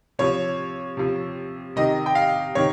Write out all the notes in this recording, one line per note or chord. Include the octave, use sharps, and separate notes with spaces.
C3 F3 C#5
C3 F3
C3 D#3 D#5
G5
F5
C3 D#3 C#5